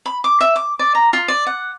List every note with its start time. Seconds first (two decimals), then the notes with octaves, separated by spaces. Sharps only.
0.06 B5
0.24 D6
0.41 E5
0.56 D6
0.79 D5
0.95 A#5
1.13 F4
1.28 D5
1.47 F#5